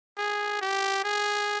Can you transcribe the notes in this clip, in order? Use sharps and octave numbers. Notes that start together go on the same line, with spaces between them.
G#4
G4
G#4